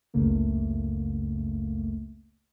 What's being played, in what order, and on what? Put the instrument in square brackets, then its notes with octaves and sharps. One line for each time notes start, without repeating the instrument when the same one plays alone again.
[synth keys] G1 C#2 F#2 C#3 A3 A#3